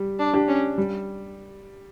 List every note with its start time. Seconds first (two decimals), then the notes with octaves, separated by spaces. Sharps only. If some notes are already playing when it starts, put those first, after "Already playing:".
Already playing: G3 G4
0.19 D4
0.33 D4 G4
0.48 C#4
0.78 G3